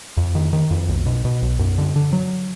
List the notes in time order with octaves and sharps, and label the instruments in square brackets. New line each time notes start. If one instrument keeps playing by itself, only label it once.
[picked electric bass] F2
D#3
D#3
F2
B1
B2
B2
B1
F#2
D3
D3
F#3